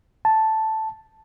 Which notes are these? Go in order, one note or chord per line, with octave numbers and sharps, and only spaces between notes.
A5